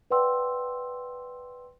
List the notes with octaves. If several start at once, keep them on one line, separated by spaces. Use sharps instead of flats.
B4 D5 F#5 G5 C6 E6